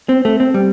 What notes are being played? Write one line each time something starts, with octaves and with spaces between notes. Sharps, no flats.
C4
A3
C4
G3